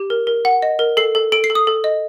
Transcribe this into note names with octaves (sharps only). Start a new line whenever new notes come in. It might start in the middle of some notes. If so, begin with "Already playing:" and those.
Already playing: G4
A#4
A#4
F#5
D#5
A#4
A4 C7
A4
A4 D7
C7
A4
D#6
A4
D#5